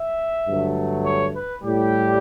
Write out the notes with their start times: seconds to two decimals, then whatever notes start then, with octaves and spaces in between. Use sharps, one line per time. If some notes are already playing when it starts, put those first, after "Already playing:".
Already playing: E5
0.47 G2 D3 F#3 A3
1.05 C#5
1.35 B4
1.63 A2 G3 G4